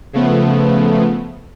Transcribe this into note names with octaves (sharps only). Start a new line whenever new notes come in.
C#3 F3 A3 B3